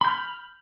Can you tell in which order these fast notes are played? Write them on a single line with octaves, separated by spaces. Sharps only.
B5 G6 F6